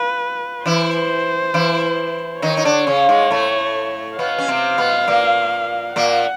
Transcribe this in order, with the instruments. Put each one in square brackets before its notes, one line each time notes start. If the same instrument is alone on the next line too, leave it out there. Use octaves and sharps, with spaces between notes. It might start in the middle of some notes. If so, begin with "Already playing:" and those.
Already playing: [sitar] F4 [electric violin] B4
[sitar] E3 E4 [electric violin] C5
[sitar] E3 E4
[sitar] D#3 D#4 [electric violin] C#5
[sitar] D#4
D3 D4
C#3 C#4
G#2 G#3
A2 A3
[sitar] B2 B3 [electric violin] F5
[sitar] C#4
C3 C4
B2 B3
A#2 A#3
[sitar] A#2 A#3 [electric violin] F#5